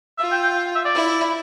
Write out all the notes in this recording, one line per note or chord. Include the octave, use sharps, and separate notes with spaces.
F4 E5
G5
G5
E5
D5
E4